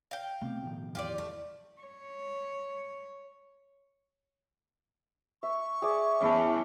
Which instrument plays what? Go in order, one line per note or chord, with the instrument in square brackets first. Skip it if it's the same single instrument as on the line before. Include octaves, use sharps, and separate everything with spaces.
[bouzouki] F5 G5
[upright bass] B2 [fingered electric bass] A3 C4
[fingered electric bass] A2 D#3 F3
[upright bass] E2 [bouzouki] F4 G4 D5
[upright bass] E3 [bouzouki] A3
[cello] C#5
[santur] E5 [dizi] C#6
[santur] G#4 D5 [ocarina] E5
[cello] E2 E3 [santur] C#4 E4 A5